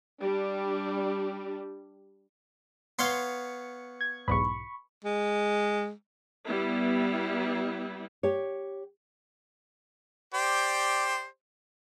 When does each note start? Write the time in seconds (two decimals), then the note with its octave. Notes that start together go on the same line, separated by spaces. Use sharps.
0.20 G3 D4
2.99 B3 C#5 F5 C6
4.01 G#6
4.28 B1 E2 G#2 B5 C#6
5.04 G#3
6.47 G3 B3 E4
8.23 G4 C#5
10.34 G4 C5 D5